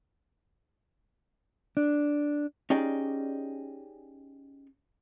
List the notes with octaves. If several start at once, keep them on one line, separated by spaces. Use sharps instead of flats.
D4
C#4 D#4 G4 G#4 D5